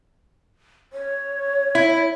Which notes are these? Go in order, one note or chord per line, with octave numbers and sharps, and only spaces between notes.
C#5
E4